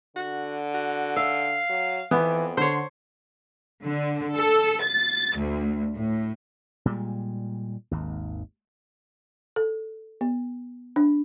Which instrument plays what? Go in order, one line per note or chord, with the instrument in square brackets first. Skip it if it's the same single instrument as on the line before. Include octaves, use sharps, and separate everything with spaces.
[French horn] D3 [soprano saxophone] F#4
[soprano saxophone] F#4
[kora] E5 [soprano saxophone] F5
[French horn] F#3
[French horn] F2 [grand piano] E3 [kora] B3
[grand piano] D3 [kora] C5 C#5 [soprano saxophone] C6
[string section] D3
A4
A6
D2
A2
[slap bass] A#2 G3 G#3
G#1 D#2
[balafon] A4
B3
D4